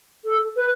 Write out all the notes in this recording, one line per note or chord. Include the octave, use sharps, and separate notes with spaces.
A4
B4